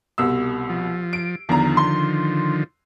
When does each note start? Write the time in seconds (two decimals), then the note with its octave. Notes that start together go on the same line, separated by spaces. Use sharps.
0.18 C2 B2 E6
0.70 F3
1.13 D7
1.49 E2 D3 D#3 F3 A#5
1.77 C6